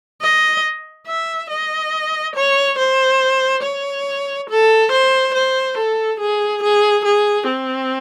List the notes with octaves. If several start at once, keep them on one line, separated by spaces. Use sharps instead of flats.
D#5
E5
D#5
C#5
C5
C#5
A4
C5
C5
A4
G#4
G#4
G#4
C4